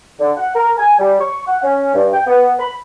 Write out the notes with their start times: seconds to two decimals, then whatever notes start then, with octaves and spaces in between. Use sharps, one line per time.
0.20 D3
0.37 F#5
0.55 A#4
0.78 G#5
0.99 G3
1.21 C#6
1.47 F#5
1.63 C#4
1.95 G2
2.14 G5
2.27 B3
2.60 B5